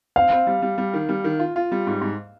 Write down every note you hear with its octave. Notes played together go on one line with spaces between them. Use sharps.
C4 F5
C4
G3
G3
G3
D#3
G3
D#3
F4
F4
G3
G#2
G#2